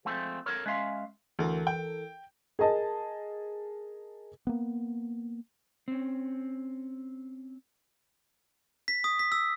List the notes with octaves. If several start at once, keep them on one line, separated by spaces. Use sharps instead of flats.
F3 G#3 A3 C4 A4
A4 A#4 C#5
G#3 C#4 E5 F5 C6
D2 E3 A4 A#4
G5
G#4 A#4 D#5 A5
A#3 B3
C4 C#4
B6
D#6
B6
E6